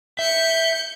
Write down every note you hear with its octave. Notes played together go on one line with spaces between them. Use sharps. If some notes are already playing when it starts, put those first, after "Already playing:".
E5 G6 C#7